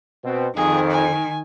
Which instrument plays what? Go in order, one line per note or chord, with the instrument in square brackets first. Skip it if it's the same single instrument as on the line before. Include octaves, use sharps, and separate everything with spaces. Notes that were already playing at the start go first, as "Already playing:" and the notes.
[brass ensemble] B2 C4
[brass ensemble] F2 [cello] D#3 [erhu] G#4
[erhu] G#5